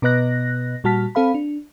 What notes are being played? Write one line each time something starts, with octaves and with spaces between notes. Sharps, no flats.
B2 B3 B4 D#5 F#6 A#6
A#2 G3 F#4 A5 F6 B6
C4 A4 F5 B5
D4